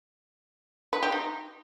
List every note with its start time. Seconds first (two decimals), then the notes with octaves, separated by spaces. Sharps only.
0.93 B4
1.03 G4
1.12 D#4